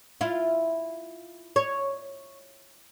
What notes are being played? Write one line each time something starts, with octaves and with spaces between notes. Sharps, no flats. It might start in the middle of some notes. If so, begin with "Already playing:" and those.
E4 F4
C#5